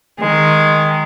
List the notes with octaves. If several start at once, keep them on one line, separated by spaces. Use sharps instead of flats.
D#3 G#3